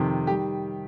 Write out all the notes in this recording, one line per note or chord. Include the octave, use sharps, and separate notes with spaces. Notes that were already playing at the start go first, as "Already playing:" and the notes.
Already playing: F2 C3 D#3
D#3 G3 G4